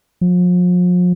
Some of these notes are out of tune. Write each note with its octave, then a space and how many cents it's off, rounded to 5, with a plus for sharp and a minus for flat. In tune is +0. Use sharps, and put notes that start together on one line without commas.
F3 +40